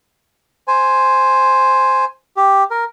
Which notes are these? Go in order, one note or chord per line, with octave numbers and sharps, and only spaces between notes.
C5 G#5
G4
A#4